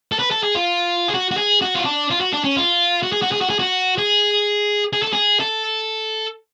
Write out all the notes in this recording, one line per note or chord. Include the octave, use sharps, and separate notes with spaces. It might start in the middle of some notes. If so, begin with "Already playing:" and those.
A4
B4
A4
G#4
F4
G#4
F#4
F#4
G#4
F#4
F4
D4
F4
F#4
D4
C#4
F4
F#4
G#4
F#4
G#4
F#4
G#4
F#4
G#4
G#4
A4
G#4
A4